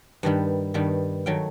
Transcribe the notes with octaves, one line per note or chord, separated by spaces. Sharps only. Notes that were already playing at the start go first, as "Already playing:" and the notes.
G2 D#3 G3 B3
G2 D#3 G3 B3
D#3 F#3 A3 G5